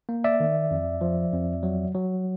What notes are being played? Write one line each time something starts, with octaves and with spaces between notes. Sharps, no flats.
A#3
D5 E5
D#3
F2
F3
F2
F#3
F#3